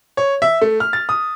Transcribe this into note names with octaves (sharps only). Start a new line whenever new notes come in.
C#5
E5
A3
F6
A6
D#6